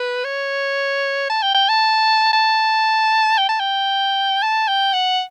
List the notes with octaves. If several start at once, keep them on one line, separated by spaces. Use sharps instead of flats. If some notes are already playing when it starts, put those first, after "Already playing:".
Already playing: B4
C#5
A5
G5
G5
A5
A5
G5
A5
G5
A5
G5
F#5